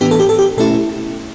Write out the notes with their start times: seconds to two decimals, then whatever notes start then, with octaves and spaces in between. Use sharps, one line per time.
0.01 A2 E3 B3 D4 G4
0.11 A4
0.20 G4
0.29 A4
0.39 G4
0.57 B2 A3 C#4 E4 A4